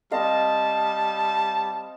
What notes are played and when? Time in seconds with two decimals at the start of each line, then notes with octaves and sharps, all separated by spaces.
0.11 G3 C4 D#5 F5 A5